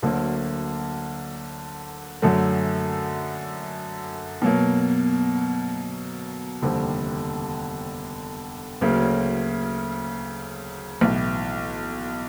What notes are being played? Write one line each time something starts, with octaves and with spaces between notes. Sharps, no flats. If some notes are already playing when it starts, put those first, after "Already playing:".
D2 D3 F#3 A#3
F#2 D3 F#3 A3
B2 F#3 A#3
F1 D#2 D3 G3 C4
D2 C#3 F#3 A#3
B1 A2 E3